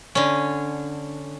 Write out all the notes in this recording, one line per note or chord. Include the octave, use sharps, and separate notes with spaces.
D3 C#4